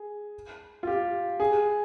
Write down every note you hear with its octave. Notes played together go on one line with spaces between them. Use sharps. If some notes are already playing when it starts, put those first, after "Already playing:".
Already playing: G#4
F4
G4
G#4